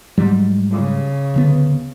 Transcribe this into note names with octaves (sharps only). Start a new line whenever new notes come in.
G#2 F#3 G3
C#3
D1 D3 B3